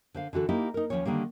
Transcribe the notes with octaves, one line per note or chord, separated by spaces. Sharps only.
D3 C5 F5
D3 E3 F#4 A4
A#3 D#4 E4 G4
D#4 A#4
D#2 C#3 F3 C#4 C#5
D3 D#3 G3 A#3